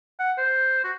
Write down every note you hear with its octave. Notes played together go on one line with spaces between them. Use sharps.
F#5
C5
F#4